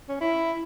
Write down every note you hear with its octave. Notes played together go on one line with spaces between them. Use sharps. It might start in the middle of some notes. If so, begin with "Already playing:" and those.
C#4
E4